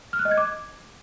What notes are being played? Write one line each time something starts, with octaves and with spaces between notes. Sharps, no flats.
F6
F#6
D#5
G#6
D6